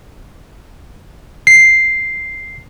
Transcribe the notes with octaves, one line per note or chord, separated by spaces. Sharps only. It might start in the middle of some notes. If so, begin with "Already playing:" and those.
C7